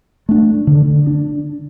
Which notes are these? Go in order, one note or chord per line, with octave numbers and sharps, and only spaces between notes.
A3 D4
D3
D4